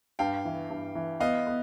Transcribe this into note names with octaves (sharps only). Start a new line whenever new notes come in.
G2 F5 G5
E3
G2
E3
B3 D#5 F5
B3